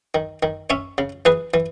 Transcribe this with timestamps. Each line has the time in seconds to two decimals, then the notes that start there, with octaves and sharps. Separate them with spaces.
0.15 D#3
0.43 D#3
0.70 C#4 C#5 E5
0.98 C#3
1.25 E3 G#4 B4
1.54 E3